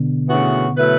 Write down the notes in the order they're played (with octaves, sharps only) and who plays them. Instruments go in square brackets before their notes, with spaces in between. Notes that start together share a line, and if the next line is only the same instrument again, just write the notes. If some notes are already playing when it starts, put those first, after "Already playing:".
Already playing: [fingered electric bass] B2 D3
[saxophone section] D2 C#3 E3 B3 F#4
F#3 A3 E4 B4